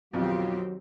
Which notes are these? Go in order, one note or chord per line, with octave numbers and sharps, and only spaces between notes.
B1 F2 D#3 F#3 C4 F4 G4